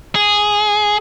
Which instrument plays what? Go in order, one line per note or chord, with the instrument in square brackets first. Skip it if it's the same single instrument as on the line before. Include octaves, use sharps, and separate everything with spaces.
[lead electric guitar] G#4